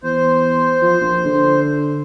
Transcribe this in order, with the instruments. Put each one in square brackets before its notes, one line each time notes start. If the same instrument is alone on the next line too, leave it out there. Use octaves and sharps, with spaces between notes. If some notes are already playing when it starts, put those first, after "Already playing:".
[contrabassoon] E2 [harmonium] C5
[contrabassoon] F3
A#1
D3